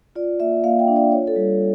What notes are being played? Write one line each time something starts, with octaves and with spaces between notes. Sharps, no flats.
F4 D5
A#3 E5
A#3 F5
G5
D4
D5
F4 C#5
A4
G3